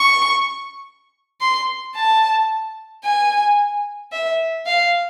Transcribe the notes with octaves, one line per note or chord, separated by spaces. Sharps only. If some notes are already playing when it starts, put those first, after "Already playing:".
Already playing: C#6
C6
A5
G#5
E5
F5